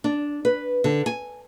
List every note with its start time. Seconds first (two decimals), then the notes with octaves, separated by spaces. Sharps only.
0.04 D4
0.45 B4
0.84 D3
1.06 G#5